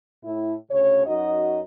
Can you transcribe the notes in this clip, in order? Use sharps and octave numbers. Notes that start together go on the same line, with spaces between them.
A2 E4
D2 C#3 C#4 C#5
F#2 D#4 F#4 D#5